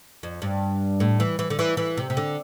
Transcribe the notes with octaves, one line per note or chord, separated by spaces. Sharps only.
F2
G2
A2
E3
E3
D3
E3
E3
C3
C3
D3